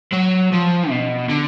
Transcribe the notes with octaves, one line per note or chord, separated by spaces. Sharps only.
F#3
F3
B2
D3